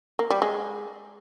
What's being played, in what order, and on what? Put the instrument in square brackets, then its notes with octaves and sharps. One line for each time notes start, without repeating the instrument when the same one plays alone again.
[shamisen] A#3
G3
G#3